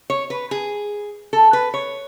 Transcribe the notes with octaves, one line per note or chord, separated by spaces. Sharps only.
C#5
B4
G#4
A4
B4
C#5